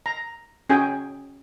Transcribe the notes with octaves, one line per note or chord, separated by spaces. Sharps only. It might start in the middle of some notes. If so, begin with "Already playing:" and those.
A#5
C#4 F#4 G#4 G5 G#5